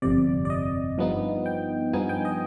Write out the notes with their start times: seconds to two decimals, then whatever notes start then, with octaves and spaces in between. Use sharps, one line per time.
0.02 G1 F2 C3 D5
0.45 D5
0.50 D#5
0.98 G2 F3 B3 D#4
1.46 G5
1.93 G2 F3 B3 D#4 G#5
2.09 G5
2.25 D#5